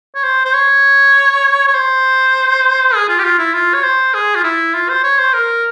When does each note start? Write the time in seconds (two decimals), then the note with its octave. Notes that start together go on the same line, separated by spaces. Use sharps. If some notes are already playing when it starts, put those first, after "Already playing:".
0.15 C#5
0.24 C5
0.45 C5
0.54 C#5
1.67 C#5
1.74 C5
2.94 G#4
3.09 F4
3.19 G4
3.23 F4
3.39 E4
3.54 F4
3.74 C#5
3.84 C5
4.14 G#4
4.35 F4
4.44 E4
4.74 F4
4.89 C5
5.04 C#5
5.19 C5
5.33 A#4